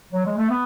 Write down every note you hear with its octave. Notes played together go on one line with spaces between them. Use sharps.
F#3
G#3
A3
B3